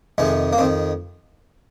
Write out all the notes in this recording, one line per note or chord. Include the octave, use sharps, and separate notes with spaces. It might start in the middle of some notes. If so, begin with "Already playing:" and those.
F2 C3 D#3 G#3
A#3
F2 D#3 C4